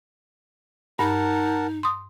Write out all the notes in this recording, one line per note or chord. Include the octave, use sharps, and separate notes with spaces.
G2 D#4 A#4 F#5 A5
C6 D#6